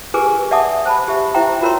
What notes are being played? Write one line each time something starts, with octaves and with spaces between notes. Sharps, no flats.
G4 G#4 A#4 B4 G#5 D6
D5 E5 F#5 A5 D6 D#6
C5 A5 B5
G4 E5
E4 C5 E5 G5 A#5
F4 F#4 A#4 C#5 A#5 C6